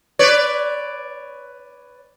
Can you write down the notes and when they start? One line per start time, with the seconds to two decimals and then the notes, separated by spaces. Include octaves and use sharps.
0.19 B4 C#5 D5